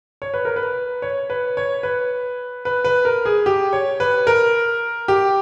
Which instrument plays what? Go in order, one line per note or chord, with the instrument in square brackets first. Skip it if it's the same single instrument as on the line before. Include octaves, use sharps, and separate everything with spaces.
[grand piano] C#5
B4
A#4
B4
C#5
B4
C#5
B4
B4
B4
A#4
G#4
G4
C#5
B4
A#4
G4